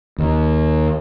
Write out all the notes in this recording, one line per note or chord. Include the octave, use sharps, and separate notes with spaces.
D#2